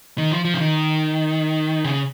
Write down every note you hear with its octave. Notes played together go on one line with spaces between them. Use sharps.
D#3
F3
F3
C#3
D#3
C#3